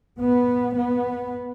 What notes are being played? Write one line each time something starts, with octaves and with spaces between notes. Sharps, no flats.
B3
B3